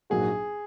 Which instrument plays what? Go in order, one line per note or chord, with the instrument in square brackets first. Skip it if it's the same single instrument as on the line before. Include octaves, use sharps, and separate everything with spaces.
[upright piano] A#1 G#2 F#3 A#3 F#4 [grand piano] G#4